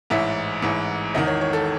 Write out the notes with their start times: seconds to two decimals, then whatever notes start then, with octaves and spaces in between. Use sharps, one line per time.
0.10 A1 G#2 E3 E5
0.62 A1 G#2 E3
1.14 E1 E2 D#3 D#5
1.27 C#5
1.41 C#5
1.53 A4